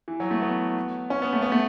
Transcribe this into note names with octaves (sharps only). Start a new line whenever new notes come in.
E3
F#3
A3
B3
C#4
B3
A3
B3
A3